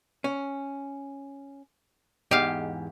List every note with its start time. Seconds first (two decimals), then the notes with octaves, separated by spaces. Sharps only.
0.24 C#4
2.31 E2 G#2 G4 D#5 F5